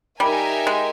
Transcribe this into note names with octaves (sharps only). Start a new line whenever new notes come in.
G3 D#4 G4 A#4 E5 G#5
G#3